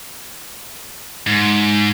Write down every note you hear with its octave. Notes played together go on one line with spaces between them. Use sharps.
G#2